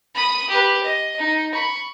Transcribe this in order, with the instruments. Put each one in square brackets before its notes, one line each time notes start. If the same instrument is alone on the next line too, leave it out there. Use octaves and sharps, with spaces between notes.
[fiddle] B5 D#6
G4 B4
D#5
D#4
B5 C#6